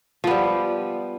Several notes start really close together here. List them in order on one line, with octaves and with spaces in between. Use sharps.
F3 B3 G3